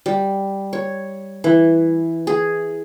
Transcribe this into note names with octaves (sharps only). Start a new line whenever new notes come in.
G3
C#5
E3
G#4